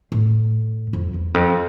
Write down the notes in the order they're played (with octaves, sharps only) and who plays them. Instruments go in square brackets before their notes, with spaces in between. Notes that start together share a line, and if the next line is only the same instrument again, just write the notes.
[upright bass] A2
F2
E2
F2